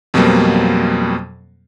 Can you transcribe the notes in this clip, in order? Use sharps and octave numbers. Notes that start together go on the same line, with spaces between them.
F2 B2 F#3 G3 A#3 C4